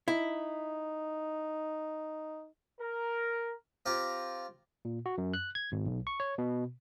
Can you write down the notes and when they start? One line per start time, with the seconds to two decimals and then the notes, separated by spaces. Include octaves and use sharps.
0.08 D#4 E4
2.80 A#4
3.86 C4 F4 G4 A#5
4.85 A#2
5.06 F#4
5.18 F#2
5.34 F#6
5.55 G#6
5.72 G#1
5.86 B1
6.07 C#6
6.20 C#5
6.38 B2